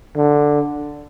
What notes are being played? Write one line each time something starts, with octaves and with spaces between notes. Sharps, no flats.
D3